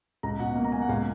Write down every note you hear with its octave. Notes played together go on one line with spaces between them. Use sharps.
C#2 A#5
B2 F#5
A#3
A#5
A#3 G#5
F#5
C#2 F5